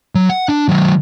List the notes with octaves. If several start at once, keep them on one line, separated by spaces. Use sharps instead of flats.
F#3
F#5
D4
D#3 F#3